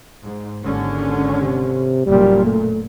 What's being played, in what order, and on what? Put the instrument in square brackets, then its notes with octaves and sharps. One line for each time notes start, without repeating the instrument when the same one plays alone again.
[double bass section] G#2
[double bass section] G#1 D3 C#4 [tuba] D#2
[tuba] C3
[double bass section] F#1 A#2 [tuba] G3
[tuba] A3